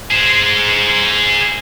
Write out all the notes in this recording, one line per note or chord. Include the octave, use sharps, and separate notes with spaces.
G#4 C5